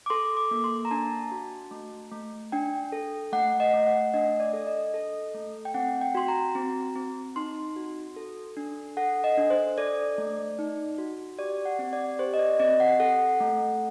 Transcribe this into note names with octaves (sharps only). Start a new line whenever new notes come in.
D6
A4 C6
D6
A#3
C6
A#5
D4 A5
F#4
A3
A3
D4 G5
A4
A3 F#5
D#5
A3
F#5
D4 D#5
D5
A4
D#5
A4
A3
G5
C4 F#5
G5
F#4 C6
A#5
C4
C4
D#4 C6
F#4
A4
D4
A4 F#5
D#5
D4
C5
A4 D5
A3
D#4
F#4
G4 D5
F#5
C4
D5
G4 C5
D#5
D5
C4 D#5
F#5
A4 F#5
A3